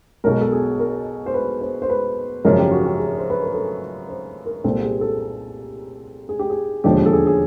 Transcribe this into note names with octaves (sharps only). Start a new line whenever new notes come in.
B1 B2 G#3 A#4
A4
G#4
A#4
C5
B4
C5
C5
B4
G#1 F#2 C#3 F3 G#3 A#4
G4
F#4
G4
G#4
C5
B4
A#4
A4
C5
A#4
C2 A#2 G3 C4 A4
G#4
A4
G#4
G4
G#4
E1 D#2 D3 F3 G#3 G4
G4
A4
G#4
G#4